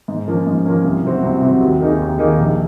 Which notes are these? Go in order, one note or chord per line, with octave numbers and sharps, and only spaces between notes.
G#2
F3 A#3 C#4
G#2
F3 A#3 C#4
C2
C3 F#3 C4 F#4
C2
C3 F#3 C4 F#4
D#2
D#3 A#3 D#4 G#4
D#2
D#3 A#3 D#4 G#4
A#1